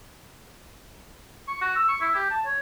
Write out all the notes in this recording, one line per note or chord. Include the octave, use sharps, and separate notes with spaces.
C#6
F#4
E6
C#6
E4
G4
A5
C#5